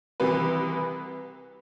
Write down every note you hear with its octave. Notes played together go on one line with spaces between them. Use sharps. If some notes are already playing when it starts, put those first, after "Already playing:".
C2 C3 E3 B4